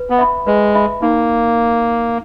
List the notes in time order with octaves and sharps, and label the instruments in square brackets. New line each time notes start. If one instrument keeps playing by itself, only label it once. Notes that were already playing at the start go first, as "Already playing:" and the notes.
Already playing: [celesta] B4
[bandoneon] B3
[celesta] E5 B5
[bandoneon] G#3 [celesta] B4
[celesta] E5 B5
[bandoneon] A#3 [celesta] D#4